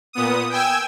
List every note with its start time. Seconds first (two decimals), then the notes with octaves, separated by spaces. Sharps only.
0.13 A#2 B3 D#6
0.50 G5 G#5 E6